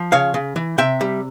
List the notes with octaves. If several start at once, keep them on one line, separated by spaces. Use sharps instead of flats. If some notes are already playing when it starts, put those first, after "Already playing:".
Already playing: F3
C#3 C#5 F5
C#3
E3
C3 E5 G5
G3